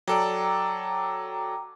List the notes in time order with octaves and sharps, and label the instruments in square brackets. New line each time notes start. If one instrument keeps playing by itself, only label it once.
[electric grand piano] F#3 A4 D5 [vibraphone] G5 A#5 D6